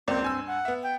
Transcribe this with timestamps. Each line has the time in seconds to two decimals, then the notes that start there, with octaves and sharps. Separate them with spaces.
0.08 C#2 A#3 C4 D5
0.22 G2 G#5 E6
0.47 F#5
0.65 B3 E5
0.83 G5